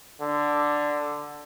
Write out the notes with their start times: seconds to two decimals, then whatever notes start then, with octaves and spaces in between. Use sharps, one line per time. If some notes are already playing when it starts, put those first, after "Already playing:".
0.21 D3